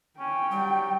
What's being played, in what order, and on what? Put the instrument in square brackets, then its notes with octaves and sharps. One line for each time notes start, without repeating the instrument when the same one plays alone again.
[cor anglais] C#4 [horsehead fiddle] G5
[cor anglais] F#3 [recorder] G3